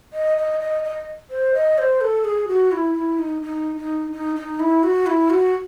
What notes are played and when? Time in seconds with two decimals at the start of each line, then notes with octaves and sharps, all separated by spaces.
0.13 D#5
0.37 D#5
0.60 D#5
0.84 D#5
1.30 C5
1.54 D#5
1.78 C5
2.01 A4
2.24 G#4
2.48 F#4
2.72 E4
2.95 E4
3.19 D#4
3.42 D#4
3.77 D#4
4.12 D#4
4.36 D#4
4.60 E4
4.83 F#4
5.07 E4
5.30 F#4